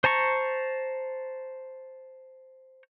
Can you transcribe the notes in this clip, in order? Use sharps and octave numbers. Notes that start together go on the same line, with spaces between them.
C5 A5 A#5 C#6